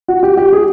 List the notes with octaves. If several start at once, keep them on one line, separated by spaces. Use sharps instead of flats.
F#4
G4
G4
G#4